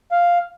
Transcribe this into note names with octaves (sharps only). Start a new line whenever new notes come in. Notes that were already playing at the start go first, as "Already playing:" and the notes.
F5